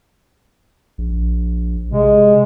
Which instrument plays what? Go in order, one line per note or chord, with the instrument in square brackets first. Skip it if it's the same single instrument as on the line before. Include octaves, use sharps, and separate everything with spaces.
[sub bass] A#1
[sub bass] C3 [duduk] G#3